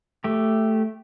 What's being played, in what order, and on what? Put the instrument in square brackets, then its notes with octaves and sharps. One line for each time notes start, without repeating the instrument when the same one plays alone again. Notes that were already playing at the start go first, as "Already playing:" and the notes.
[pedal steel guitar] A3 G4